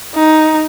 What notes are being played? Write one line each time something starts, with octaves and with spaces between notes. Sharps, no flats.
D#4